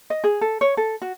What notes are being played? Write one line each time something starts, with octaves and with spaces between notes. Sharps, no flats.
D#5
G#4
A4
C#5
A4
F#4